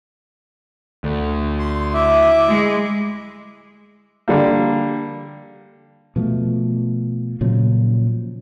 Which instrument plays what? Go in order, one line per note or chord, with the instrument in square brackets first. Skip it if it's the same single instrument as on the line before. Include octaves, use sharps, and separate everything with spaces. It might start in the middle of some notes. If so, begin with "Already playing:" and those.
[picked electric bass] D2
[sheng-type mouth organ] C6
[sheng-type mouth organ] E4 E5 [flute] D6
[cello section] G#3
[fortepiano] D3 G3 A#3
[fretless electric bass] B2 F3 A3
A#2 C#3 F3 F#3